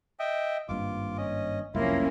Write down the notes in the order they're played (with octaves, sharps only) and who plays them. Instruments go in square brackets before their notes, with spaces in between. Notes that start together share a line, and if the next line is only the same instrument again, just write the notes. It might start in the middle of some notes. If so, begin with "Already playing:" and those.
[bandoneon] D#5 E5 G5
[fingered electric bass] G#1 G2 A#3 [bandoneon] F4 D6
[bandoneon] C#4 D#5
[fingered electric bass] F1 C2 F#2 [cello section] F3 A#3 C#4 [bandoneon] E4 F4